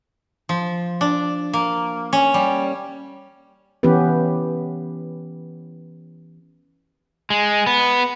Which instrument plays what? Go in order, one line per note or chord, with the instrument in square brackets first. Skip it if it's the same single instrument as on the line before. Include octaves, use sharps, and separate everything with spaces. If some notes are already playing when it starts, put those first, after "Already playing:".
[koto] F3
D4
A#3
C#4
G3
[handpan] E3 B3 C#4 G4 B4
[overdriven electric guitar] G#3
B3